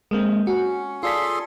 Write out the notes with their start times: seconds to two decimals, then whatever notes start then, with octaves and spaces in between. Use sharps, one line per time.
0.11 G#3 A#3 C4
0.47 C#4 F#4
1.03 F4 G#4 A4 D5 C6 B6